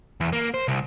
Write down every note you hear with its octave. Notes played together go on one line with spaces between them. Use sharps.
E2
A#3
C5
C2